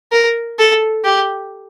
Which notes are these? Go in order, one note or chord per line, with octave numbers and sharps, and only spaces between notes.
A#4
A4
G4